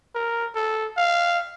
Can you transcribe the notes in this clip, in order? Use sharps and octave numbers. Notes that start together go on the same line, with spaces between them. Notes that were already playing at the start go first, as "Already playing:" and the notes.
A#4
A4
F5